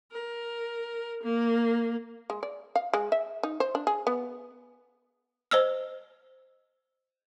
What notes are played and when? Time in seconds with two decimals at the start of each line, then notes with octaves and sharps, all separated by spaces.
0.12 A#4
1.24 A#3
2.30 G#3
2.43 D5
2.76 F5
2.93 G#3
3.12 E5
3.43 D#4
3.60 C5
3.75 D4
3.87 G#4
4.07 B3
5.51 C5 D#5 E6 F6